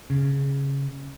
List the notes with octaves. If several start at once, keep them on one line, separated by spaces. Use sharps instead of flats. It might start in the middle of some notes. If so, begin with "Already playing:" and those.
C#3